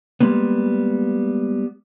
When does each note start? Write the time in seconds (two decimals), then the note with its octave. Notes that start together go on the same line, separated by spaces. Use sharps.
0.21 G3 G#3 A#3 B3